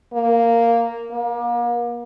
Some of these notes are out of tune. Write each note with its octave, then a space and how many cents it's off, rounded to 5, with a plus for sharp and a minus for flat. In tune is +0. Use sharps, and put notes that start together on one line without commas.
A#3 -5
A#3 +35